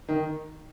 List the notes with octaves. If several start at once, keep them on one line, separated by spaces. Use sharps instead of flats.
D#3